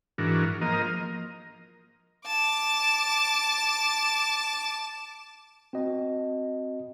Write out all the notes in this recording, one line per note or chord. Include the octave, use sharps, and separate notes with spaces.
G#2 E3 D4 F#4 A#4
F3 A#3 A#4 D#5
A5 D6
C4 F#4 D#5